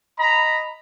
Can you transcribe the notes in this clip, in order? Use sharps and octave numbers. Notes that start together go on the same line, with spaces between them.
D#5 A#5 B5